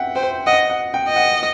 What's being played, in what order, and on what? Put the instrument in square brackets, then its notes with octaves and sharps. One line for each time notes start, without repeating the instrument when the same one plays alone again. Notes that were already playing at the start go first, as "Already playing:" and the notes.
Already playing: [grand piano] E5 F#5 G5
[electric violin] C5 [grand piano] G5
[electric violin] D#5 [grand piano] F#5
[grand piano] F#5
G5
[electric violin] D#5
[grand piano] F#5